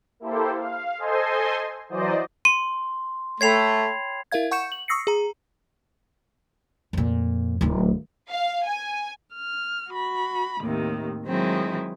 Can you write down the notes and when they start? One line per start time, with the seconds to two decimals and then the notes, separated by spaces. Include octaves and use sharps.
0.20 A#3 E4 G4 A4 C5
0.56 F5
0.98 A4 C5 D#5 G#5 C6
1.89 E3 F#3 C5 D5 D#5
2.45 C6 D#7
3.41 A3 C#5 G5 B5 G#6 C7 F7
4.32 E4 A#4 E5 F5 G#6
4.51 F#5 C#6 G6 C#7 E7
4.72 F#7
4.88 C#6 D#6 E6 A#6 C7 C#7
5.07 G#4 A#5
6.93 F2 A#2
7.61 D1 D#3
8.30 F5
8.66 G#5
9.34 F6
9.89 F#4 B5
10.60 D#2 A2 C3 D#3
11.26 D#3 F#3 G#3 C4 E4